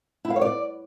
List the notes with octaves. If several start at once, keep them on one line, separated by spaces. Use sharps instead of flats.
E4
F5
C#5
D5